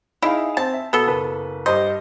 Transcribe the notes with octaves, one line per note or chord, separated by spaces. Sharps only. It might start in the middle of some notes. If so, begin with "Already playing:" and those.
D#4 E4 G#4 F5
C4 A5
E5
B2 B3 A4
F#1 B4
G2 C5 D#5